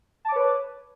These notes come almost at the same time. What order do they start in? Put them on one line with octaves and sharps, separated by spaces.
A5 D6 C#5 B4